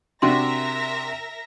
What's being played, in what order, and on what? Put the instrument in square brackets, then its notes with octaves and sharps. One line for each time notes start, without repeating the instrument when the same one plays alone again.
[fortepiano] C3 D4 F#4 [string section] A#4 E5 A#6 [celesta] C6